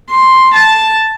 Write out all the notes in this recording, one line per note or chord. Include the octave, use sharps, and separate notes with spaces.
C6
A5